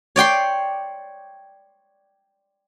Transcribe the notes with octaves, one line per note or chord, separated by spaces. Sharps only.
C#5 D5 G5 C6